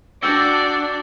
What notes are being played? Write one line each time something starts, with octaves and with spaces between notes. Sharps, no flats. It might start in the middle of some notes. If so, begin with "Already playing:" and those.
D4 F#4 D5 F#5 G5 E6 G6 C#7